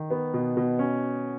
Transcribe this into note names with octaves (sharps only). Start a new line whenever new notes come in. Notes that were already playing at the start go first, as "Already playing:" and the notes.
Already playing: D#3
B3
B2
B2
C#4